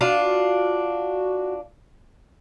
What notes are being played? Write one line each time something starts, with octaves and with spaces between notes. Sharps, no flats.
D4 F4 F#4 F5